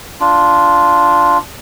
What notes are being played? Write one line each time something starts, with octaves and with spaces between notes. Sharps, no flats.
D4 F4